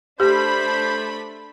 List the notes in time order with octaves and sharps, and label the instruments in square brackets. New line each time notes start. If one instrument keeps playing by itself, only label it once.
[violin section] A3 D4 B5 [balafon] G4 [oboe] C5